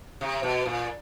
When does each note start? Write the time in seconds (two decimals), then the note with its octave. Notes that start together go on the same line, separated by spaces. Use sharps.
0.21 C3
0.43 B2
0.66 A#2